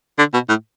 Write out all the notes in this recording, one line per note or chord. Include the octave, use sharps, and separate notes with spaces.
D3
B2
A2